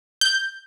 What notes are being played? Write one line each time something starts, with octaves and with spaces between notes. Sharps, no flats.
G6